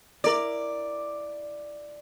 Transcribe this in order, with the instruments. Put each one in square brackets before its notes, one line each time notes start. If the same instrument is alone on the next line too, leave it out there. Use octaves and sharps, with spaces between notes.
[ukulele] E4 A#4 [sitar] D5